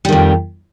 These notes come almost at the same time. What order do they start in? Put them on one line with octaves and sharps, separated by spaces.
G3 D#3 F2